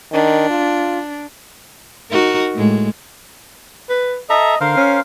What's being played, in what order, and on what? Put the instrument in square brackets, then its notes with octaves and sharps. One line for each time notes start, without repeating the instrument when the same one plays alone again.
[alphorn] D#3 [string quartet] D4
[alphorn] F4
[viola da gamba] D#4 F#4 A#4
A2 G#3
[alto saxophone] B4
[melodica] A4 E5 A#5 [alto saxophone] D#5
[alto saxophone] D3 [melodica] A#4 C5 F5
[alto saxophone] C#4